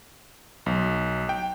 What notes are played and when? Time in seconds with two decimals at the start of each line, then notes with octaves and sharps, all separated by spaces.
0.66 B1
1.29 G5